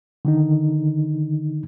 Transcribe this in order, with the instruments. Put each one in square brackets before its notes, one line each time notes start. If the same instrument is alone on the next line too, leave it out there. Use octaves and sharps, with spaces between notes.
[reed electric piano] D3 D#3 D#4